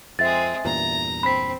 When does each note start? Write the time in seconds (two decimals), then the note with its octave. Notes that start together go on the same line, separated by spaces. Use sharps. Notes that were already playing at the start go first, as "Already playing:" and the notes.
0.19 F2 G#3 C4 E5 A6
0.65 E2 G2 A#2 A#5
1.23 C4 B5 B6